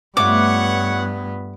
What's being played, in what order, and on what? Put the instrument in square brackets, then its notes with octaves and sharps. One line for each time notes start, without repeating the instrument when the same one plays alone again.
[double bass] G2 B3 [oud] A3 F4 E5 [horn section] C#5 F#5 [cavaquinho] D6